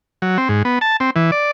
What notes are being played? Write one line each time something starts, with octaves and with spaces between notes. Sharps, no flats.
F#3
C4
G#2
B3
A5
C4
E3
D5